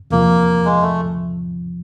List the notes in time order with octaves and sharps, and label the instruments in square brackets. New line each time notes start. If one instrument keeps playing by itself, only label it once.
[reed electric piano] E2 C3 F3 [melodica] A#3
[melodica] G#3
A3